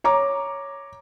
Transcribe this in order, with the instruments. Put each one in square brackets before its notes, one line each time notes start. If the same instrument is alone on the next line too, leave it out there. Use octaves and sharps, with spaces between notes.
[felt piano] C#5 A#5 D6